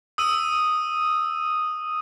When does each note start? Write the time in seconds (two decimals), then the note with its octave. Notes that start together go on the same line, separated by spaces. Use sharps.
0.18 D#6 E6 D#7